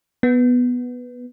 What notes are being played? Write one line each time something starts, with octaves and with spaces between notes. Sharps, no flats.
B3